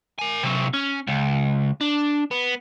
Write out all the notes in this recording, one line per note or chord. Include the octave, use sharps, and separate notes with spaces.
A#4 G#5
C3 F#3
C#4
C#2
D4
B3